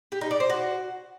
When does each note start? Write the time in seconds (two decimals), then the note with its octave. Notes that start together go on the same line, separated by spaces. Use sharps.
0.12 G4
0.21 D#4
0.31 D5
0.40 C5
0.50 F#4